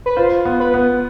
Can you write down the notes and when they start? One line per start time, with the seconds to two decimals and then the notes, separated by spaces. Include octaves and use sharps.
0.06 B4
0.16 F4 C5
0.45 B3
0.60 B4
0.74 B3